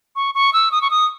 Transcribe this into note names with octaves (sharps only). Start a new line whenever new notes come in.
C#6
C#6
E6
D#6
C#6
D#6